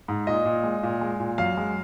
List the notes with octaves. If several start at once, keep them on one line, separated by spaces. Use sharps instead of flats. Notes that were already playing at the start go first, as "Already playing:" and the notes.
G#2
A#2 D#5
A#2
G#3
A#2
G#3
A#2
F#2 F5
G#3